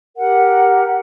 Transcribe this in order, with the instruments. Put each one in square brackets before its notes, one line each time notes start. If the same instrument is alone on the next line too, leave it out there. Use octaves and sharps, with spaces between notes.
[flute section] G4 A#4 F#5